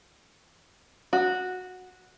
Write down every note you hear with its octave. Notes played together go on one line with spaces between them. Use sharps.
F#4